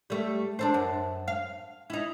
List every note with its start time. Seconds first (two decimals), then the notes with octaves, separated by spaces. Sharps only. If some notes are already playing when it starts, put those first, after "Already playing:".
0.10 G3 A3
0.59 D4 A4 C5
0.74 F#2
1.28 F5
1.90 D#4 E4